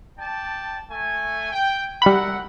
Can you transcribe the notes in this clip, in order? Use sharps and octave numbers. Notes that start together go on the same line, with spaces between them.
D5 G5 A5
A3 G#5
G5
G3 A#4 E5 F#5 B5